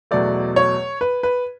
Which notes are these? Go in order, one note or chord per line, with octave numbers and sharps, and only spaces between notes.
E2 B2 F#3 A3 D5
C#5
B4
B4